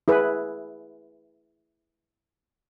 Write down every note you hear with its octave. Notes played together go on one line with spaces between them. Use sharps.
E4 G#4 B4